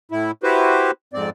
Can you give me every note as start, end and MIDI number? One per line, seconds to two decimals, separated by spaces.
0.11 0.31 45
0.11 0.31 64
0.43 0.91 64
0.43 0.91 66
0.43 0.91 67
0.43 0.91 71
0.43 0.91 72
1.13 1.30 41
1.13 1.30 44
1.13 1.30 60
1.13 1.30 74